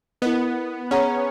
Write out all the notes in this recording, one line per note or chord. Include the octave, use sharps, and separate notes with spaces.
B3 E4 A#4 D#5
C#4 G#4 C#5 F#5 A#5